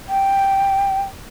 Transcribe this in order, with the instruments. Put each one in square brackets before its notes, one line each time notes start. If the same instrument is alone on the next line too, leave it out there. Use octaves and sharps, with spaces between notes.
[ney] G5